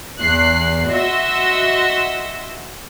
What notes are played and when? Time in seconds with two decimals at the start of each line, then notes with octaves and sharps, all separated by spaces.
0.20 E2 F#6 C7
0.89 F#4 D#5 E5 F#5 C6 E6